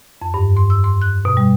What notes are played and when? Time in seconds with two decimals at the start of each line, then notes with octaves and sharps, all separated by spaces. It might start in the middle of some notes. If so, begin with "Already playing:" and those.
0.22 F2
0.34 G2
0.56 C6
0.70 E6
0.84 C6
1.02 F#6
1.25 B2
1.37 G3